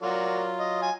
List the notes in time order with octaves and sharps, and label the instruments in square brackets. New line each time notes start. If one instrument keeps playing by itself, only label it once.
[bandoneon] F#3 F4 [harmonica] F#4 A#4 D5
[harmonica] D#5
G#5